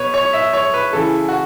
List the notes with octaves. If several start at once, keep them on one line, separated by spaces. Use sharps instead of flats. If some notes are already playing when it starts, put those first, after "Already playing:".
Already playing: B2 B4 C#5
C#5
E5
C#5
B4
C#3 E3 A4
F#4